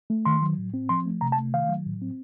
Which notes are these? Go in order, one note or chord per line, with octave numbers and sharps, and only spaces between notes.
A3
D#3 C6
F#3
A2
C4
F3 C6
A3
C3 A#5
A5
A3
D#3 F5
F#3
A2
C4